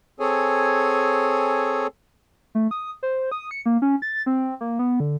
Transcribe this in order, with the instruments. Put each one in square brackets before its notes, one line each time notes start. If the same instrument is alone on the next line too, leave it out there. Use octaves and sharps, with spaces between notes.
[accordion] C4 G#4 A4 C#5 G#5
[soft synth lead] A3
D#6
C5
D#6
C#7
A#3
C#4
A6
C4
A#3
B3
D3